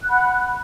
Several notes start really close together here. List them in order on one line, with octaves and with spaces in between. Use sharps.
F#6 F#5 B5